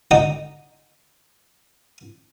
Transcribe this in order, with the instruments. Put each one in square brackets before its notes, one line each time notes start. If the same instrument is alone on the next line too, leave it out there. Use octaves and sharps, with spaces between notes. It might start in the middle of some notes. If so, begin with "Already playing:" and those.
[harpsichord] D3 D#4 D#5 G5